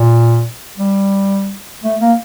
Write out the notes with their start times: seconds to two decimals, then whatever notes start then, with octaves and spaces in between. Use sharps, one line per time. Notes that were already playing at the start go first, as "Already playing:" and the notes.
Already playing: A#2
0.78 G3
1.83 A3
2.01 A#3